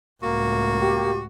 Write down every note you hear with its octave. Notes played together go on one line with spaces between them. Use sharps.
C#2 A2 A#3 F#4
G4